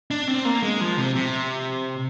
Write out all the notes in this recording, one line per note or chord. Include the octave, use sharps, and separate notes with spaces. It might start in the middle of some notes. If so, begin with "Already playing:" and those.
D4
C4
A#3
G#3
F3
C3
C3